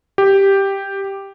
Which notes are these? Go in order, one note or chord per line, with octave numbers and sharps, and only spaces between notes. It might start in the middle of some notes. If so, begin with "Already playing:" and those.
G4